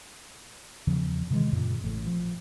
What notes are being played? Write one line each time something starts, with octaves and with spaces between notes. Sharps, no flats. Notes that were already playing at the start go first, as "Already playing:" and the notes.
E2 C#3 F3
C3 D#3 E3 G#3
F#2 A#2 C#3
A1 A2
F3